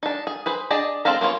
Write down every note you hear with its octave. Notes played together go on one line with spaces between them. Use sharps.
D4 D#4
G#4
G#4 B4 C5
D4 G#4 D5 D#5
G#3 C4 A4 F5 A#5
A#3 B3 F4 C#5